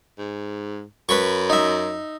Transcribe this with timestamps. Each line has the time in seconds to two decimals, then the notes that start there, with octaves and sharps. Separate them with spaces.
0.19 G#2
1.09 F#2 B4 B5 C#6
1.50 D#4 E5